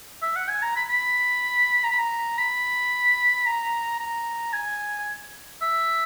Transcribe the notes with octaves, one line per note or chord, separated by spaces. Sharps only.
E5
F#5
G#5
A#5
B5
B5
A#5
B5
A#5
B5
A#5
A#5
G#5
E5